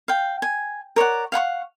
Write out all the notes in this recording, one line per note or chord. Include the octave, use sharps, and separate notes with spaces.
F5 G5
G#5
A#4 C#5 D5 F#5
F5 F#5 B5 C#6